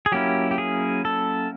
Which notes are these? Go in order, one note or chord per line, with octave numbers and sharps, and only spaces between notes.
G#4
F#3 A#3 C#4 E4 G4
G4
G#4
A4